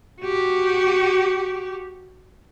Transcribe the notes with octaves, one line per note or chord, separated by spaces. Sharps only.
F#4 G4